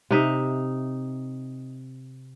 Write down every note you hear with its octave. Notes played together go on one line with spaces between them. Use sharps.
C3 D#4 E5